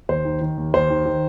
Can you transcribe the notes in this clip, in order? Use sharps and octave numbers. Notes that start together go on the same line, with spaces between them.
D#2 C5
D#3
D#3
D#2
D#2 C5
D#3
D#3